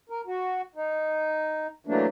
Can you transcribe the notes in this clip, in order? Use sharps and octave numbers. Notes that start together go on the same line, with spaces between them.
A#4
F#4
D#4
E3 F#3 A3 A#3 D4